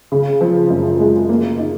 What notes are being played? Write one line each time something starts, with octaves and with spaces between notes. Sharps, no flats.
C#3
F3
F#2
G#3
A#3
D#4